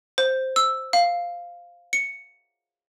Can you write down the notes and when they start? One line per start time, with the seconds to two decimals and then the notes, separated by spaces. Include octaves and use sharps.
0.18 C5
0.56 E6
0.93 F5
1.93 C#7